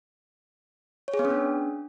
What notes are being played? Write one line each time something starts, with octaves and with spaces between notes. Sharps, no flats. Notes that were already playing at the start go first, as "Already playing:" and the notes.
C#5
G#4
B3
C#4
D4